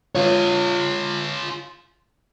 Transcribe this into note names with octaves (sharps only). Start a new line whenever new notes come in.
F4 C#5